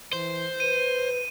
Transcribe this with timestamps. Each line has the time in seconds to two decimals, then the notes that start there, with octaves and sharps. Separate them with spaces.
0.13 E3 C5
0.60 B4 D#7